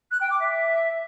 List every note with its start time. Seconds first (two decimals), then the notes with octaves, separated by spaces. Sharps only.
0.11 F#6
0.20 G5
0.30 D6
0.39 E5